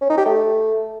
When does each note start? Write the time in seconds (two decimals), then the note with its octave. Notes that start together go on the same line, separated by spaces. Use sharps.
0.01 C#4
0.09 D#4
0.18 G4
0.26 A3